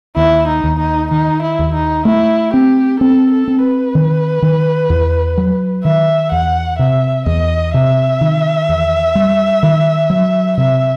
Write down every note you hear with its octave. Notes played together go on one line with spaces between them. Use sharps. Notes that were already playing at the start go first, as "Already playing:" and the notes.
D#2 E4
D#4
D#2
D#4
D#3 D#4
E4
D#2
D#4
A3 E4
C4 G4
C4 A4
A4
C4
B4
D#3
D#3
E2
F#3
D#3 E5
E2 F#5
C3 E5
E2 D#5
C3 E5
D#3
E2
G3
D#3
F#3
C3 E5